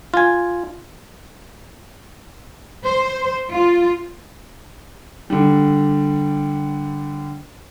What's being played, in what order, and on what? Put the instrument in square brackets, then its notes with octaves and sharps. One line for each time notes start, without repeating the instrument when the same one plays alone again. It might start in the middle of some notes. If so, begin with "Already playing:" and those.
[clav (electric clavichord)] F4 G#5
[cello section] C5
F4
[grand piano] D3 G3